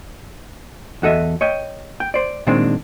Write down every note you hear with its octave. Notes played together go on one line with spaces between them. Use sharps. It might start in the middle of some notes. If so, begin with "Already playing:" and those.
E2 F#4 A4 D#5 E5
C#5 D#5 G5
G5
C5 D5
A#2 D#3 G#3 C4 D4